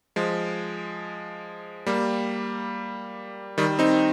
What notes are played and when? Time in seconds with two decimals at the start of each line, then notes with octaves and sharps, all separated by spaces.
0.16 F3 G#3
1.86 G3 A#3
3.58 D#3 G3
3.79 C4 D#4